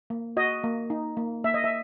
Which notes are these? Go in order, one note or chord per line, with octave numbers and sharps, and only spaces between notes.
A#3
F#4 D#5
A#3
D#4
A#3
A#3 E5
D#5
E5